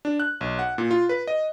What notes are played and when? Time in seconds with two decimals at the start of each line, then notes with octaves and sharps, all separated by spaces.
0.05 D4
0.20 F#6
0.41 B1
0.59 F#5
0.78 A#2
0.91 F4
1.09 B4
1.27 D#5